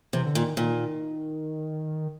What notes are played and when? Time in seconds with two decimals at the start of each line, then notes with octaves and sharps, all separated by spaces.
0.13 C3 E3
0.26 D3
0.35 A#2 D#3
0.57 A#2 D#3